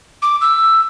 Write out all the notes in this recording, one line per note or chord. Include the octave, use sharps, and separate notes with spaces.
D6
E6